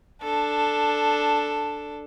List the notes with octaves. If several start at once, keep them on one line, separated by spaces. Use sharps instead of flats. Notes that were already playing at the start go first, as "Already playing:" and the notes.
D4 A4